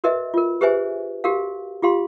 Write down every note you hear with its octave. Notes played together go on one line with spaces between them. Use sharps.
F#4 A#4 B4 D#5 E5
F4 A#4
G4 G#4 B4 C5 E5 G#5
F#4 G4 A#4 F5
F4 G4 F5 C6